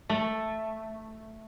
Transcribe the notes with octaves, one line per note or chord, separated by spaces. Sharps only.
A3